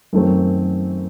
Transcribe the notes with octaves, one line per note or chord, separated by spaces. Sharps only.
F#2 D#3 F#3 A3 C4